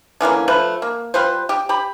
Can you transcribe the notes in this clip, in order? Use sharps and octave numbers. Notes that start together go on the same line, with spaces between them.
D3 E3 A#3 C#4
F3 A3 B4
A#3
G3 F4 B4 C5
G4
G4 B5